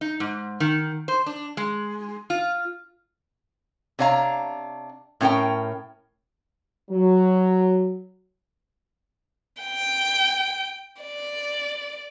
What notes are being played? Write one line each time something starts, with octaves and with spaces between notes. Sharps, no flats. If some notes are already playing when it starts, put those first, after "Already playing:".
D#4
G#2
D#3
C5
D4
G#3
F4
C3 D4 C#5 F5 A#5
A2 C#4 A#4 G5
F#3
G5
D5